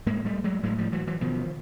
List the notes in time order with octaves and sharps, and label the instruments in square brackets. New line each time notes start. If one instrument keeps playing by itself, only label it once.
[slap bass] A2 G#3 A#3
G3 A3
F#3 G#3
A2 F#3 G#3
F3 G3
E3 F#3
E3 F#3
B2 D#3 F3